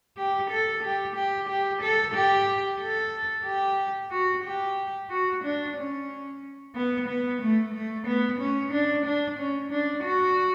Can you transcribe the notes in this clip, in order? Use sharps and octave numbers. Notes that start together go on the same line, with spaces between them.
G4
A4
G4
G4
G4
A4
G4
A4
G4
F#4
G4
F#4
D4
C#4
B3
B3
A3
A3
B3
C#4
D4
D4
C#4
D4
F#4